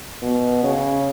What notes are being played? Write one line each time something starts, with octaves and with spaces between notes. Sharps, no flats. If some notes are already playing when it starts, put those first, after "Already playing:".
B2
C#3